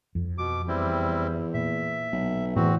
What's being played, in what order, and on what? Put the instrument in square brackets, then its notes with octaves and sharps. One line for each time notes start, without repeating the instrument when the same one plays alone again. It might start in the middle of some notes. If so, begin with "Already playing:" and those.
[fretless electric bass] F2
[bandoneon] B2 D6
[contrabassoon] E2 [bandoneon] G3 C4 E4
[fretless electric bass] A#2 [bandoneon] E5
[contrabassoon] B1
[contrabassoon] E2 [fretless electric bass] A2 E3 [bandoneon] C4 F#4